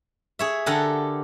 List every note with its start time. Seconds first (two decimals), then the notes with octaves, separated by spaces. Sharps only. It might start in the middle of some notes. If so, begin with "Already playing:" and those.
0.39 G#4 C#5 E5
0.66 D3 G4 A4 A#4 F#5 G#5